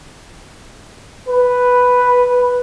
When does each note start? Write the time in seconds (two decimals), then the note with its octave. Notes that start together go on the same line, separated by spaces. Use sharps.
1.28 B4